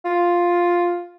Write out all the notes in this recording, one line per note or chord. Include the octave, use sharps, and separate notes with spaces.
F4